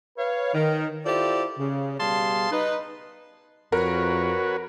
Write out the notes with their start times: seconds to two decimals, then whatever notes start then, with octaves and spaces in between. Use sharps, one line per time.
0.17 B4 C#5 F5
0.54 D#3
1.06 E4 F4 G4 A4 C5 D5
1.58 C#3
1.99 B2 G3 G#4 F5 A5 C6
2.51 D#4 B4
3.72 F2 F#4 A#4 B4 C#5